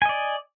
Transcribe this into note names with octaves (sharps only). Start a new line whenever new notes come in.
D5 D#5 G#5